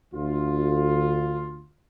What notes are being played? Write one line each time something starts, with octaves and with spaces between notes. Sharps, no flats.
D2 F4